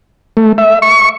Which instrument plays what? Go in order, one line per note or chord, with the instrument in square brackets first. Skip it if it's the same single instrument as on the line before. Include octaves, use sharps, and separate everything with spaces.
[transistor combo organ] A3
E5
C#6